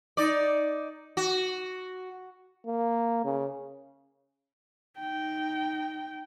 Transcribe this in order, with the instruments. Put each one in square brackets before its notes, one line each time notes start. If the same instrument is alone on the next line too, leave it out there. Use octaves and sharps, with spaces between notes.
[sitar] D#4 D5
F#4
[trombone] A#3
C#3
[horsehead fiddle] D#4 G5